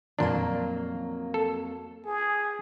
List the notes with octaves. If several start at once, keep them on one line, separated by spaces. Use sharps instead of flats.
F2 A#2 F#3 A#3 D4
A4
G#4